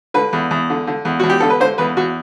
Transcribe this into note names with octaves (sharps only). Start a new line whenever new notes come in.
D3 B4
E2
E2
D3
D3
E2
E2 F#4
G4
D3 A4
B4
D3 C5
E2 B4
E2 F#4